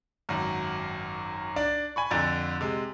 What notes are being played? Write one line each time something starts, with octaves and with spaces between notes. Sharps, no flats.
G#1 F#2
D4 D5
G#5 B5 C#6
F2 D3 A#5 A6
C3 G#3